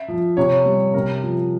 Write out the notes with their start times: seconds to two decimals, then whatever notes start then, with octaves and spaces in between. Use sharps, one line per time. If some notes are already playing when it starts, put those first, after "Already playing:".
Already playing: E5
0.08 F3
0.37 C3 C#5
0.65 G3
0.94 C3 A#4
1.23 F3